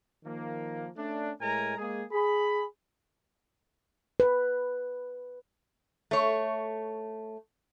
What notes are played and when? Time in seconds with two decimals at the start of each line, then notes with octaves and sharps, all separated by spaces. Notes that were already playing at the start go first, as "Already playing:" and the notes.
0.24 D#3 F3 A#3
0.96 A3 C#4 D4
1.40 A2 G#3 A#4 G#5 A#5
1.77 G#3 A#3 G#4
2.12 G#4 B5
4.20 B4
6.11 A3 C#5